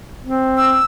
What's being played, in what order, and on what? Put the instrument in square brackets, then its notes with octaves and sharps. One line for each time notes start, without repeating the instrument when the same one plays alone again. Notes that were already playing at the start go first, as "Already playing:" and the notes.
[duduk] C4
[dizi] E6